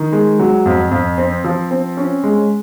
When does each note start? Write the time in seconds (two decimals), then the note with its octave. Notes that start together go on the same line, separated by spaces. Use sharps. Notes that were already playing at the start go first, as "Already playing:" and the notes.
Already playing: D#3
0.12 G#3
0.39 F#3
0.66 F2
0.91 F2
1.18 C4
1.44 F3
1.71 C4
1.97 C#4
2.24 G#3